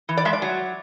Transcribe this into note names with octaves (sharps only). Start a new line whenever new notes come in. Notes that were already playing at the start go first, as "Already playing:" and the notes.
E3
D5
G#3 E5
D5
F#3